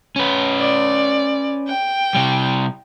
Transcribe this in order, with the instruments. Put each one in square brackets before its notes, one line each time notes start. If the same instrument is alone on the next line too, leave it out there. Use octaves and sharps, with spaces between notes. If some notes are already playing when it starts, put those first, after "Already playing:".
[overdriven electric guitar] C#4 B4
[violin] D5
G5
[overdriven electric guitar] C3 G3